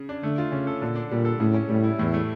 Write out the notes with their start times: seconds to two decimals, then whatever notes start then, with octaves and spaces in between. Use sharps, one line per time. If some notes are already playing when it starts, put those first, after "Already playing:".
Already playing: C#3
0.09 D4
0.23 D3 A3
0.38 F4
0.52 C#3 C#4
0.67 A4
0.81 A#2 D3
0.96 D4
1.11 A#2 G3
1.25 A4
1.40 A2 C#3
1.54 C#4
1.69 A2 G3
1.84 E4
1.99 E2 A2
2.14 A3